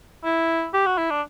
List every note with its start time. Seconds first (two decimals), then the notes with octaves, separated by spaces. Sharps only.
0.24 E4
0.74 G4
0.86 F#4
0.98 E4
1.11 D4